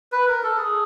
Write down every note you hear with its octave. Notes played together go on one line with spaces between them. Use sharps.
B4
A#4
A4
G#4